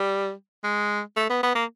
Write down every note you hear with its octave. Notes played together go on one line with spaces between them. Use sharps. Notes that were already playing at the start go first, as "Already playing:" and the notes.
Already playing: G3
G#3
A3
B3
B3
A#3